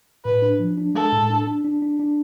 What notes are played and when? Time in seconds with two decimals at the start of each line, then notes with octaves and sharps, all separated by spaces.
0.25 A2 B4
0.42 D4
0.60 F3
0.77 D4
0.95 G#3 A4
1.12 A2
1.30 D4
1.47 D4
1.64 D4
1.82 D4
2.00 D4